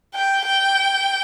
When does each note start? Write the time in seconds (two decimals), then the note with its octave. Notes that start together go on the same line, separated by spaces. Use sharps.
0.15 G5
0.46 G5